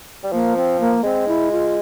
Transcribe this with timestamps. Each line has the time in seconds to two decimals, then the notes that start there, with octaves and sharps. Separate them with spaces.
0.24 G3
0.32 F3 A#3
0.56 C4
0.80 A#3
1.03 G#3 C4
1.28 E4
1.51 F4